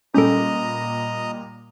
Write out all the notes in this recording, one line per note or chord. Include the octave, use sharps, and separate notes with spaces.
A#2 G3 C#4 A4 D#5 A#5 D#6